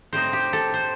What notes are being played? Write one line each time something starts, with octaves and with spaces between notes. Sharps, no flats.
A2 G3 C4 D#4 C5
G4
A4
C5